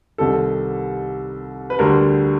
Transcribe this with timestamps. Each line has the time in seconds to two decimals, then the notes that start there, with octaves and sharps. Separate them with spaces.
0.18 C2 C3 D#3 G3 A4
1.70 B4
1.79 D2 D3 G3 A#4